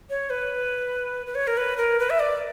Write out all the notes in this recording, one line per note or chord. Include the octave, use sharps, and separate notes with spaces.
C#5
B4
B4
C#5
A#4
B4
A#4
B4
E5
D5